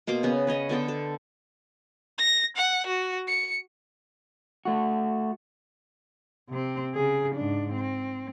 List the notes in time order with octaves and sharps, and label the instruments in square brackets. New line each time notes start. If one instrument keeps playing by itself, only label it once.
[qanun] B2 A#3 C6 D6
C#3 B3
B4 C#5 D#5
D3 B3 A4 G5
A4
[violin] A#6
F#5
F#4
C#7
[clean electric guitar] A3 F#4
[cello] C3 C4
C#3 G#4
G#2 D4
C4